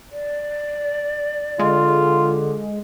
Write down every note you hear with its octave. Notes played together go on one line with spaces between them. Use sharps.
D5
D3 G#3 F4